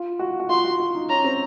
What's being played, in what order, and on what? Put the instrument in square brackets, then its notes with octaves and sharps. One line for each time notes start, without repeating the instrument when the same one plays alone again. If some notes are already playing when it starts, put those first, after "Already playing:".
Already playing: [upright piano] F4
F#4
F#4
[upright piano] F4 [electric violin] C6
[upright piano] F#4
F4
D#4
[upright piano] C#4 [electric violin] A#5
[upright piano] C4